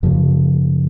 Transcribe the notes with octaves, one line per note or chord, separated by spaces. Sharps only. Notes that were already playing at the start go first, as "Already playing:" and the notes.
F#2 C#3 F3